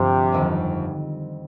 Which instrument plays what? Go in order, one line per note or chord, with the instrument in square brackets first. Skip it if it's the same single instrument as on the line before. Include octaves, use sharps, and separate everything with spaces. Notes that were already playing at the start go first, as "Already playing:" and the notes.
Already playing: [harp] G1 G2 F3 C4 F4 [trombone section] C3
[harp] G1 F2 D#3 G3